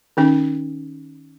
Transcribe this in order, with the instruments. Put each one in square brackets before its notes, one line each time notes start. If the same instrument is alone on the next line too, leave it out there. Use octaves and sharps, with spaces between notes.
[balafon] D#3 C#4 D#4